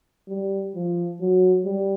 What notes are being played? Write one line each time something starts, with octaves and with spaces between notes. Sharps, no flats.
G3
F3
F#3
G3